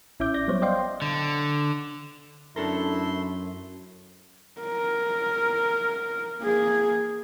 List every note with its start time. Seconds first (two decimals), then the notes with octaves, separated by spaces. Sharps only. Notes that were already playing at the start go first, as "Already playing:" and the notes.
0.20 A1 C#4 E4 E5 D6 G6
0.34 D5 G6 A#6
0.48 F#3 G3 B3 C5 C#5
0.62 C5 D5 D#5 F5 G5 C6
1.02 D3
2.56 F#2 A3 D4 E4 A4 A#4 C6
4.61 A#4
6.39 A#3 G#4